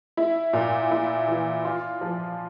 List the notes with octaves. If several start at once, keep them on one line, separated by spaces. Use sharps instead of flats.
E4
A#2
E4
E3
F4
F3